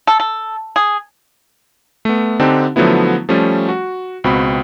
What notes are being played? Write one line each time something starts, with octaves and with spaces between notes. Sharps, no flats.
A4
A4
G#4
A3 B3
D3 C4 D4 D#4 G4
D3 F3 F#3 A3 B3 E4
F3 G3 A3 C#4
F#4
C#2 B2 C4 F#4 B5